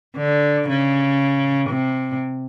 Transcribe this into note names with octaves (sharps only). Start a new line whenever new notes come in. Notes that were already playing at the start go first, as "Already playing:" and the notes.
D3
C#3
C3